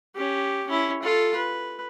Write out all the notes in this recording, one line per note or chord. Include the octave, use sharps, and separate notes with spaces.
C#4 G4
C#4 E4
F4 A4
B4